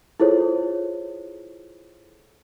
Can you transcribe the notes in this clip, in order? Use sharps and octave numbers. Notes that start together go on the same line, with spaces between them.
E4 F4 G#4 A4 C5 C#5